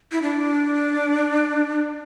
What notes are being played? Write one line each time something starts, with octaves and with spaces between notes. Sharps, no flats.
E4
D4